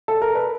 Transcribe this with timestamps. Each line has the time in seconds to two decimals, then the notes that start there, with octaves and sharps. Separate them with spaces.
0.08 A4
0.22 A#4
0.35 B4